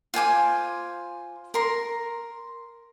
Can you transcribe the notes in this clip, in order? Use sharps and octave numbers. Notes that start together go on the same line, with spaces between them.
F4 C5 G#5 D6
A#4 C6